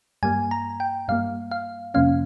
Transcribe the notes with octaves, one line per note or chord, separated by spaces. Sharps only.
G2 G3 A#3 G#5
A#5
G5
G2 G3 A#3 F5
F5
F2 C3 F3 A#3 C#4 F5